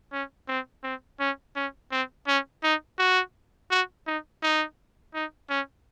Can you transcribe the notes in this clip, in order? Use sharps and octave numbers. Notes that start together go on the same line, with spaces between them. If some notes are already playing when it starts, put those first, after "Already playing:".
C#4
C4
C4
C#4
C#4
C4
C#4
D#4
F#4
F#4
D#4
D#4
D#4
C#4